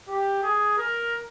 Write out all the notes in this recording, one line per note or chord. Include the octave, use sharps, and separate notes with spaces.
G4
G#4
A#4